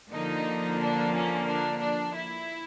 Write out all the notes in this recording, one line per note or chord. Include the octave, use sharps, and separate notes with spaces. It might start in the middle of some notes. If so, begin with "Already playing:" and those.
D3 F3 A#3 D#4
D4
C#4
D4
D4
E4